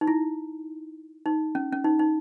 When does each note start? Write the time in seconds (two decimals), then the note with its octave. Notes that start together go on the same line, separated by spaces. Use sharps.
0.01 D#4
0.07 E4
1.26 D#4
1.55 C#4
1.73 C#4
1.84 D#4
1.99 D#4